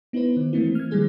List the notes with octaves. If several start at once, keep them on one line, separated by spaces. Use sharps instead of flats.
B3 D#4 E4 B4 C5
D#3
E3 A3 A#3 C4 E4
F6 G#6
D#3 F3 G3 G#3 G#4 C5